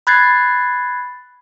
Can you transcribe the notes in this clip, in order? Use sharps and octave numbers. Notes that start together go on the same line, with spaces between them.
B5 F#6 G#6 A6 C7